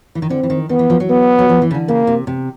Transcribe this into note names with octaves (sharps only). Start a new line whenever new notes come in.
E3
D#3
D3 C4
E3
D#3
D#3 B3
E3
F3
F#3
B3
F#3
F3
E3
C#3
D3
C#3 A#3
C3
C3